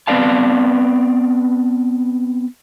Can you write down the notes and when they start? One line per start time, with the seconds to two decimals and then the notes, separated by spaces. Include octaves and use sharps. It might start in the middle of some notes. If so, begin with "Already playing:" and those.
0.07 B3 C4 B4 D5 F5 A5